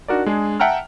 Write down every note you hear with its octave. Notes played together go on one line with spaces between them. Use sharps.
D4 D#4 F#4 A#4 D5
G#3 D4 G#4
E5 F#5 G5 A5 A#5 F6